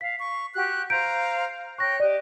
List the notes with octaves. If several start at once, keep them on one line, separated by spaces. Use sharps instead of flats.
F5 B6
C#6
F#4 G4 F#6
C5 F5 A#5 G6 D7
C#5 G5 C#6 F#6 A#6
G4 D5 D#5